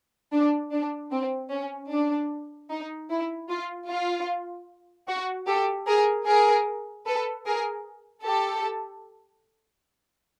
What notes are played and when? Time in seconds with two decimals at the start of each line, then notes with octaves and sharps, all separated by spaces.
0.32 D4
0.72 D4
1.11 C4
1.51 C#4
1.91 D4
2.70 D#4
3.10 E4
3.49 F4
3.89 F4
5.08 F#4
5.47 G4 A4
5.87 G#4 A#4
6.26 G#4 A#4
7.06 A4 B4
7.46 G#4 A#4
8.25 G4 A4